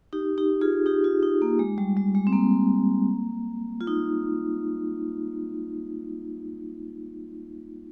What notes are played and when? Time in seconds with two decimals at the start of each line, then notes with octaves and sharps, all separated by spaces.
0.13 D#4 G4
0.38 D#4 G4
0.61 F4 G#4
0.86 D#4 G4
1.04 F4
1.23 D#4
1.42 A#3
1.59 G#3
1.78 G3
1.97 G3
2.15 G#3
2.27 C4
2.33 A#3
3.81 F4
3.87 D#4